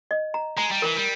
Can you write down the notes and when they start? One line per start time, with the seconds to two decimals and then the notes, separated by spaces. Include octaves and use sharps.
0.11 D#5
0.34 A#5
0.58 G#3 A#5
0.72 G3
0.82 E3 A#4
0.97 G3